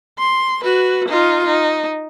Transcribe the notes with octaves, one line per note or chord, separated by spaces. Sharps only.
C6
F#4 B4
D#4 F4
D#4